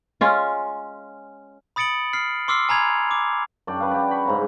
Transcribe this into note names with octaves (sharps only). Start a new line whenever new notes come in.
G#3 C#4 F4
B5 D#6 A6 C#7 D7 F#7
F6 C7
C6 D6 E6 F6 C7
G#5 A#5 B5 G#6 F7
D6
F#2 D4 D5 G5
B4 F5
D5 F#5 G5 A5
B5 C#6
G#2 C#3 A#5